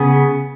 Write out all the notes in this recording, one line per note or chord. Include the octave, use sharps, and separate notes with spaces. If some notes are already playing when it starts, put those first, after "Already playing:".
Already playing: C#3 B3 G#4